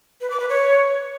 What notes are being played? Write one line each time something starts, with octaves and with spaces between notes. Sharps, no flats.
B4
D6
B4
C#5